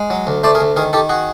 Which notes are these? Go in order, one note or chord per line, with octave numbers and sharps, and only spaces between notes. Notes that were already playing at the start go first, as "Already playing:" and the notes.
Already playing: G#3
F#3
D2
A3 C5 D5
G#4 A#4
D2
D#3 G#4 A#4
D#3 G4 A4
F#4 G#4